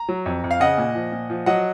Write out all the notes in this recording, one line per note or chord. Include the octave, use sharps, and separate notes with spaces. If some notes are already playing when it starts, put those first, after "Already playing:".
Already playing: A#5
F#3
F2
F2
F5
C#3 D#5 F#5
A#2
F3
A#2
F3
F#3 D#5 F#5